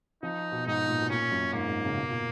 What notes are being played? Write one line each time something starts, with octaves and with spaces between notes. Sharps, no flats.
F3 D#4
B2
G#2 D#4
A#2
B2
A#2 C#4
F#2
G#2 A#3
G#2
C#3
B2
A#2